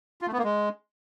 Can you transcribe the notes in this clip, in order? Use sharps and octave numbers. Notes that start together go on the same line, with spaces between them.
F4
A3
B3
A#3
G#3